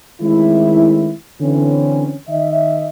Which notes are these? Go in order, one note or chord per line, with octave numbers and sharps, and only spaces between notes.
D#3 G#3 A3 C4 E4
D3 E3 C4 C#4
D#3 D#5 E5